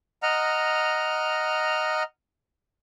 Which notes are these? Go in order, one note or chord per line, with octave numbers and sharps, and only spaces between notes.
D#5 F#5 A#5 F6